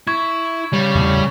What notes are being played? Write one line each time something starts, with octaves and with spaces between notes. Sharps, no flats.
E4 C#6 G#6
C#3 G3 C#5
E2 A2